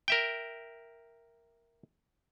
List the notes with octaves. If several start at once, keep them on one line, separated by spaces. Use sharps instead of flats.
A#4 E5 G5